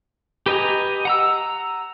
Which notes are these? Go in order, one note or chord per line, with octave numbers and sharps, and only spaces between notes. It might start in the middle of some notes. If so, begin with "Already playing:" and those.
G4 B4 D#5 G#5 A#5
F#5 A#5 E6